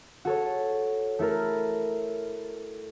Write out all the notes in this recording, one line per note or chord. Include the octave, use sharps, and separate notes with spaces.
F#4 A4 C#5
A3 E4 A4 A#4